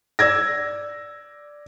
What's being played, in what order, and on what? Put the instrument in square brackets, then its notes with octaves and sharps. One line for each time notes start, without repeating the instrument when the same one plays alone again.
[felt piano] D5 E6 G#6 A#6